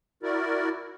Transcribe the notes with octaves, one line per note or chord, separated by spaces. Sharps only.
E4 F#4 A#4 D5